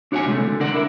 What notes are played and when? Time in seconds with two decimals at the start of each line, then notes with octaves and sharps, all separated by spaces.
0.12 D4 F#4 C#5 F5 F#5 G#5
0.27 C3 G#3 A3
0.43 D3
0.60 D4 A#4 D5 F#5
0.74 E4 A4 A#4